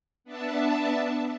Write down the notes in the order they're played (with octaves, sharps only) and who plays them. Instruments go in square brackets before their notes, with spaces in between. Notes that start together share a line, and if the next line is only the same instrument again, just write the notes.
[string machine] B3 D4 E5 A5